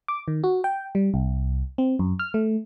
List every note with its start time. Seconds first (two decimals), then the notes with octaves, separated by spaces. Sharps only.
0.08 D6
0.28 D#3
0.44 F#4
0.64 G5
0.95 G3
1.14 C2
1.78 C4
1.99 F#2
2.19 F6
2.34 A3